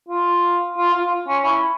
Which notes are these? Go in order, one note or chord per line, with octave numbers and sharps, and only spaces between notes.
F4
F4
F4
C#4
E4